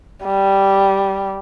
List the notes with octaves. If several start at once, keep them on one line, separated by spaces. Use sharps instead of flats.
G3